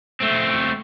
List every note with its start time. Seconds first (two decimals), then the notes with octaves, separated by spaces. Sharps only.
0.21 A3 C4